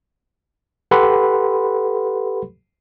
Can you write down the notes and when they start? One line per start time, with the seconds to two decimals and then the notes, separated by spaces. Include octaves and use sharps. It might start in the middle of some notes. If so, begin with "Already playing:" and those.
0.91 G4 A4 B4 F#5 B5 C6